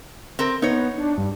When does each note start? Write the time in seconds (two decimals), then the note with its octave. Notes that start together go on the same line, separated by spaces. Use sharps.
0.39 C4 A#4
0.62 B3 D#4 C#5
0.98 D4
1.18 G2